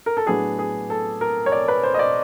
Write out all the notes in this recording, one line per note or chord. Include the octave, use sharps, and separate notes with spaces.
A#4
A4
A2 F#3 B3 D4 G#4
G#4
A4
A#4
C#5
D5
B4
C5
D#5
D5